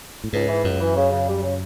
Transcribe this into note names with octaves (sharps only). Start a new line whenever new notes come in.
A2
C#2 G#2
E3
C#2 F#2
E3
C#3
C#3
G3
C#3